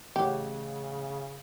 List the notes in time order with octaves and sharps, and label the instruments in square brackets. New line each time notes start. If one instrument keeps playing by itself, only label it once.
[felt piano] A1 C#5 F#5 [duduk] C#3 [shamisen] G4